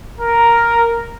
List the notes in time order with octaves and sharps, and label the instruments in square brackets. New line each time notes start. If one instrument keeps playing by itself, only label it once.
[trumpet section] A#4